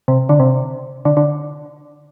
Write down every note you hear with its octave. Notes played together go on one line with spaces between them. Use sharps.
C3
D3
C3
D3
D3